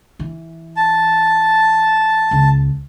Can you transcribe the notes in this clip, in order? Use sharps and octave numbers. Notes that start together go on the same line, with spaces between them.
E3
A5
C#2